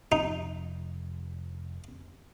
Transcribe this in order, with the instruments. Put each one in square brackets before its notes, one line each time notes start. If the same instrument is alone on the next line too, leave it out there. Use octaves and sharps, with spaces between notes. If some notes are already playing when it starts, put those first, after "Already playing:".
[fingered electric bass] F1 [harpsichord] D#4